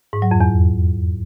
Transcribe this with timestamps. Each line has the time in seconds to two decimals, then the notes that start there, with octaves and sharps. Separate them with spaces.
0.13 G#2
0.22 F#3
0.31 F2
0.41 E2